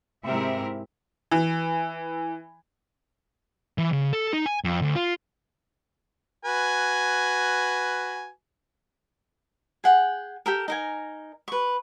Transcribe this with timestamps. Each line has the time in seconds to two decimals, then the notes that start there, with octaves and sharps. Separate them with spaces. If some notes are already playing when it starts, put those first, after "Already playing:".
0.24 G#2 C3 C4 E4 A#4 E5
1.31 E3
3.78 E3
3.93 C#3
4.13 A4
4.33 D#4
4.46 G#5
4.64 F2
4.82 D2
4.95 F4
6.45 F#4 B4 G#5
9.84 G#4 F#5 G5
10.46 G4 A4 A#4
10.68 D#4 A#4 G#5
11.48 B4 C#6